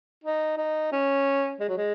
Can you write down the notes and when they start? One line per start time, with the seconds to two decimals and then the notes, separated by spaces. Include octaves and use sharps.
0.24 D#4
0.58 D#4
0.92 C#4
1.60 G#3
1.69 F#3
1.77 G#3